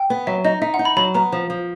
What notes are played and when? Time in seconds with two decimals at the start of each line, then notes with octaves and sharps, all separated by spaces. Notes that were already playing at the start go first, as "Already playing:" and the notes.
Already playing: G5
0.10 B3
0.27 F#3 E5
0.44 D#4 D#5
0.61 D#4 E5
0.74 F#5
0.79 D#4
0.85 B5
0.96 F#3 B5
1.15 B3 A#5
1.32 F3
1.50 F3